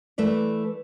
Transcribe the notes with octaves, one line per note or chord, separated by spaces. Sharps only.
E3 A3 B4 D5